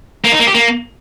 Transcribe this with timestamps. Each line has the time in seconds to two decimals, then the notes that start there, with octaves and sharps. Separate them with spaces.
0.25 A#3
0.32 D#4
0.40 A#3
0.47 G4
0.55 A#3